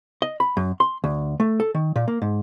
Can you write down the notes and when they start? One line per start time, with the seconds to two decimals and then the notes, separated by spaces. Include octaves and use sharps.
0.22 D#5
0.40 B5
0.57 F#2
0.80 C6
1.04 D2
1.40 A3
1.60 A4
1.75 D#3
1.96 A#2
2.08 A#3
2.22 G#2